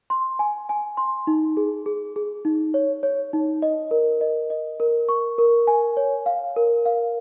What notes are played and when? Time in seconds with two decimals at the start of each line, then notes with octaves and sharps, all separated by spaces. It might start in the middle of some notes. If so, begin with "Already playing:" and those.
0.10 C6
0.39 G#5
0.69 G#5
0.97 C6
1.27 D#4
1.57 G#4
1.86 G#4
2.16 G#4
2.45 D#4
2.74 C#5
3.03 C#5
3.33 D#4
3.62 D#5
3.91 A#4
4.21 D#5
4.50 D#5
4.80 A#4
5.09 C#6
5.38 A#4
5.67 G#5
5.97 C#5
6.26 F5
6.56 A#4
6.86 F5